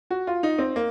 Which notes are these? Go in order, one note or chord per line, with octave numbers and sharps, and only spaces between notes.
F#4
F4
D#4
C4
A#3